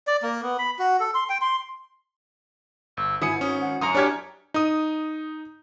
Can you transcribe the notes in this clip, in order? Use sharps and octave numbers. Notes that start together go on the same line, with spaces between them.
D5
A#3
B3
B5
F#4
A4
C6
G5
C6
G1 E6
G#1 E4 G#5 D#6 C#7
C#4 D#6
F#5
F#2 A#5 C6 D#6 C#7
D4 G4 C#5 F6 G#6
D#4 D#6